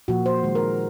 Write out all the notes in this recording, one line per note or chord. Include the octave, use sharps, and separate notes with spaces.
A#2 F3 A#3 F#4
C5
D#3 G#3
A#4